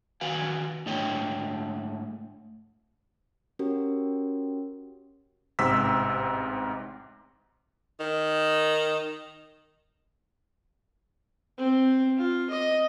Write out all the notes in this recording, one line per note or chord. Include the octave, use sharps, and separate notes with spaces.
D#3 F#4 B4 F5 G#5
G#2 A3 D4 C#5 D#5 G5
C#4 F#4 G4 A#4
A1 G#2 C3 E6 B6
D#3
C4
F4
D#5